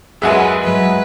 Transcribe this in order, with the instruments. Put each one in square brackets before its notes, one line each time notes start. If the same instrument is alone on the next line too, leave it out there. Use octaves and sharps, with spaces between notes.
[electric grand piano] F#2 G#4 [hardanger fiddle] G#3 B4 [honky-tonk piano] E5 F#5 G#5
[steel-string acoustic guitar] G2 F#3 D#5 [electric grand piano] G#3 [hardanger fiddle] B4